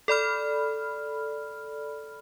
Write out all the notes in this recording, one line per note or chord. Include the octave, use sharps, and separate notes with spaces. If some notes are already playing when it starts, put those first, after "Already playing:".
A4 D5 B5 F6